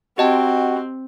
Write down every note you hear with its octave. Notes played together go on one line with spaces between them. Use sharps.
C4 F#4 G4 D#5 G5 A5